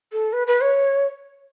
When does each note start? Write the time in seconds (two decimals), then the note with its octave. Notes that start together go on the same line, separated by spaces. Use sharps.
0.12 A4
0.33 B4
0.47 B4
0.61 C#5